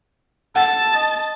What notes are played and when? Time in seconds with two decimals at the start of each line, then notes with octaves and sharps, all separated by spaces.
0.56 A4 F#5 A5
0.94 D#5